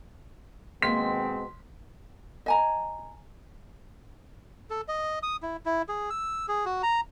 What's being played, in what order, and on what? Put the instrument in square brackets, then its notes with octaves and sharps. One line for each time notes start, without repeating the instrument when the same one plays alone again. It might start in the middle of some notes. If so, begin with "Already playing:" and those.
[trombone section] B2 G#3 C4 [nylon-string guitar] D#3 A#3 [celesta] C6 [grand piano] B6
[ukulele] D#5 G#5 A#5
[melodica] A4
D#5
D#6
E4
E4
G#4
E6
G#4
F#4
A#5